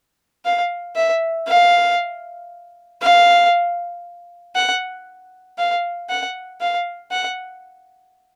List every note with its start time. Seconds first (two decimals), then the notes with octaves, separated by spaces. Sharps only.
0.45 F5
0.96 E5
1.48 F5
3.02 F5
4.55 F#5
5.58 F5
6.10 F#5
6.61 F5
7.11 F#5